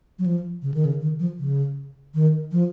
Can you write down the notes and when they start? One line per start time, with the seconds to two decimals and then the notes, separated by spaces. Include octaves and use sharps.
0.19 F#3
0.26 F3
0.62 C#3
0.74 D#3
0.85 C#3
1.01 D#3
1.20 F3
1.39 C#3
2.14 D#3
2.52 F3